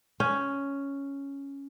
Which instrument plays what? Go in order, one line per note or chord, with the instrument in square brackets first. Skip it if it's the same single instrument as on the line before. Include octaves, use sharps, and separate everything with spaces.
[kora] C#4